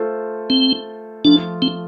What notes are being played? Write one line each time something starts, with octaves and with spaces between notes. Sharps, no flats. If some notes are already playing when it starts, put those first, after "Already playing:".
Already playing: A3 F4 A4 C5
C4
F3 A3 D4 F4
C4